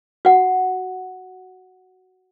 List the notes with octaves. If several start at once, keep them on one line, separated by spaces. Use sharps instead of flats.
F#4 F#5